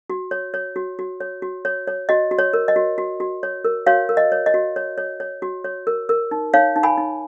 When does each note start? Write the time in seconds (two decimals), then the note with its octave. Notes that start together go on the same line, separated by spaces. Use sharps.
0.10 F#4
0.31 C#5
0.54 C#5
0.76 F#4
0.99 F#4
1.20 C#5
1.42 F#4
1.65 C#5
1.87 C#5
2.09 F#4 D#5
2.31 F#4
2.39 C#5
2.53 A#4
2.68 D#5
2.76 F#4
2.98 F#4
3.20 F#4
3.43 C#5
3.64 A#4
3.86 F#4 C#5 F5
4.09 A#4
4.17 D#5
4.32 C#5
4.46 D#5
4.54 F#4
4.76 C#5
4.98 C#5
5.20 C#5
5.42 F#4
5.64 C#5
5.87 A#4
6.09 A#4
6.31 D#4
6.54 D#4 C#5 F5
6.76 D#4
6.83 G#5 B5
6.98 D#4